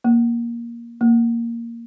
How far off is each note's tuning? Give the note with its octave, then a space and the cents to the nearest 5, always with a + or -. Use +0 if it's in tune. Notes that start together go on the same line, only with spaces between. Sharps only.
A#3 +10
A#3 -5